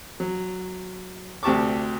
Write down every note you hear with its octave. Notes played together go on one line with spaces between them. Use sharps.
F#3
D2 C3 G4 A5 C#6 D6